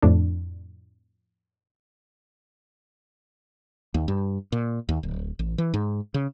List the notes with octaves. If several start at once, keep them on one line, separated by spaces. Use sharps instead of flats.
F2 A2 D4
D#2
G2
A#2
D#2
D1
A1
E3
G#2
C#3